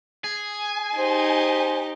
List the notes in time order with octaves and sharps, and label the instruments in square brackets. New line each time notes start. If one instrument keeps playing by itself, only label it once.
[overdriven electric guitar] G#4 [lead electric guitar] G#5
[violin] D#4 G4 [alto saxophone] C5